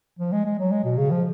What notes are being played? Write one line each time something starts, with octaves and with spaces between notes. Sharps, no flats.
F3
G#3
G#3
F#3
G#3
B2
C#3
F3